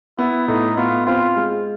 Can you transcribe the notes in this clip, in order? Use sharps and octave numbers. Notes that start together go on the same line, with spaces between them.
B3 E4
A2 D#4
B3 F4
C4 F4
G#3